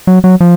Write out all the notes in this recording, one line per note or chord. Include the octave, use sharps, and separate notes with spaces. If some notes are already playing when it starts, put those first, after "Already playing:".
F#3
F#3
F3